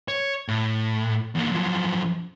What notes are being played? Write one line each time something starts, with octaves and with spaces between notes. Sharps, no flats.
C#5
A2
E2 A#3
F#2 F3